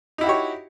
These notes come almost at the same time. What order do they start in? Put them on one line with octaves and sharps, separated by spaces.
D#4 E4 F#4 G4 C#5